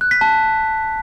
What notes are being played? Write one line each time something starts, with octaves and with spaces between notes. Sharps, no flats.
F#6
B6
A5